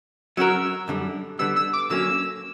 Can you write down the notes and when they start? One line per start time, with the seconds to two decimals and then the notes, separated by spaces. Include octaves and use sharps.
0.37 F#3 C#4 F#4 A#4 E6
0.88 F#2 D3 G3
1.39 D3 G3 B3 E6
1.56 E6
1.73 D6
1.90 D3 F#3 A#3 C#4 E6